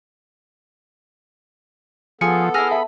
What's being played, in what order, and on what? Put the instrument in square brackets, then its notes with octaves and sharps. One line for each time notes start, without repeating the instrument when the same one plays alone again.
[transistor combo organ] F3 [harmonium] B3 A4 [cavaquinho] G#4 [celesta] C#7
[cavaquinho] E4 G#4 [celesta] E6 A#6 [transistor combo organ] F6
[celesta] E5 A5 [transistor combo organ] B5